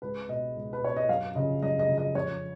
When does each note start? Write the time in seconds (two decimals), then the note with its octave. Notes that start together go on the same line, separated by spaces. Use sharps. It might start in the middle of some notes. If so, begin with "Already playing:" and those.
0.02 C#2 B4
0.29 B2 D#5
0.56 C#2
0.73 B4
0.82 B2 C#5
0.96 D#5
1.09 F#2 F5
1.35 C#3 F3 D#5
1.62 F#2 D#5
1.79 D#5
1.89 C#3 F3
1.98 D#5
2.15 F2 C#5